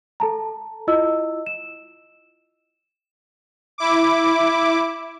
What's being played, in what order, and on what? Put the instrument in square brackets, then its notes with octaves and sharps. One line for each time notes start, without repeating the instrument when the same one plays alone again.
[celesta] A4 A5 A#5
E4 F4 D#5 E6
E7
[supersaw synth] E4 D6